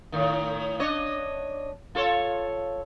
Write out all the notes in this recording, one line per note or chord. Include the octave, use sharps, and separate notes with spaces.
A2 D#3
D4 C#5 D#5
F4 A4 C#5